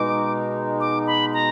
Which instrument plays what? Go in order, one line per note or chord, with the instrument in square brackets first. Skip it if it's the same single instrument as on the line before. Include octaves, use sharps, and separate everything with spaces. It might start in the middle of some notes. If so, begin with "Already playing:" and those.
Already playing: [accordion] B2 G#3 D#4 [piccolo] D6
[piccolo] D6
B5
A#5